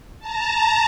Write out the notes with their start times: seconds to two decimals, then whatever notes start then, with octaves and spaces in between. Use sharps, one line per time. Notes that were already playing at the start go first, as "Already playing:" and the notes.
0.19 A5 A#5